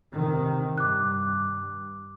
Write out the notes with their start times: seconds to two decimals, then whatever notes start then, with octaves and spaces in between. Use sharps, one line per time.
0.11 C3 D#3
0.78 G2 D6 F#6